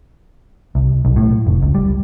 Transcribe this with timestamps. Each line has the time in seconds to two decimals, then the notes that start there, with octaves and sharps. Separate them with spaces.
0.75 C2
1.05 B1
1.16 A2
1.47 F1
1.63 C#2
1.75 G3